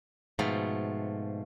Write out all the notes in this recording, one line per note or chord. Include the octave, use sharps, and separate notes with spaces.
G#2 B2 F3 A3